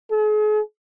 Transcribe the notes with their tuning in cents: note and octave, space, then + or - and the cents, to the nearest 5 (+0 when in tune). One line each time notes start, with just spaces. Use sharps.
G#4 +40